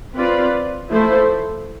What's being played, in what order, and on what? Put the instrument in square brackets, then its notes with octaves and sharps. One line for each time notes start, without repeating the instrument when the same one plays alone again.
[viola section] C4 F4 B4 D5
F3 A3 E4 A4 C5